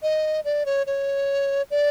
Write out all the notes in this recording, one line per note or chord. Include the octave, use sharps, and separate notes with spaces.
D#5
D5
C#5
C#5
D5